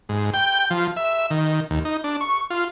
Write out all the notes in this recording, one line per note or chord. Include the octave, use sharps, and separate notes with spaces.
G#2
G5
F3
E5
D#3
D#2
D#4
D4
C#6
F4